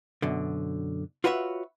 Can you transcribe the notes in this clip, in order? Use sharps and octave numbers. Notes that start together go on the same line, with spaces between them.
F#2 B2 D3
F4 F#4 B4 C#5 D#5 E5